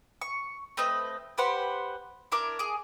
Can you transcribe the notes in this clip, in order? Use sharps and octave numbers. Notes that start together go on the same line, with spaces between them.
C#6
A3 C4 B4 D#5
G4 B4 C5 F#5
D4 E4 A#4 D6
G#4 D6